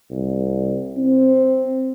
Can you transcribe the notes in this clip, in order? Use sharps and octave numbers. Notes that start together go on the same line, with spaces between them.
C2
C4